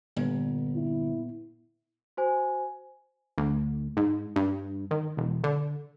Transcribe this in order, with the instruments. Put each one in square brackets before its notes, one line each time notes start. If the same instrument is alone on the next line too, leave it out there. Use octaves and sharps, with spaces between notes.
[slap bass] G1 [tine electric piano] A#2 B3
[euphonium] E4
[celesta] F#4 C5 G#5
[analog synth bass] D2
G#2
G2
D#3
E1
D3